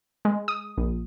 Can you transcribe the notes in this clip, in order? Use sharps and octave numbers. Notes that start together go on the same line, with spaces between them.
G#3
D#6
A#1